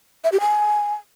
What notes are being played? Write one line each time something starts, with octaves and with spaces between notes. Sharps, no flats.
E5
G4
G#5